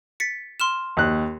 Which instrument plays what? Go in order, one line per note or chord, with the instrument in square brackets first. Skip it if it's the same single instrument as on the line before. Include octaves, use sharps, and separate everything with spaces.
[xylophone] A6 B6 C#7
C6 F6 E7
[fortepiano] D#2 F#6